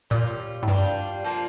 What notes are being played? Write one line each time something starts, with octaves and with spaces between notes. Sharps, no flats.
A#2 G3 C#4 F4
A2
G2 G3 D4 F4
F3 A#3 D4 F4